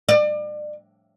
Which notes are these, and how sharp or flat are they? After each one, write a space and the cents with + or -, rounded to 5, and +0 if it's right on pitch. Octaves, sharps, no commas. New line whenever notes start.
D5 +35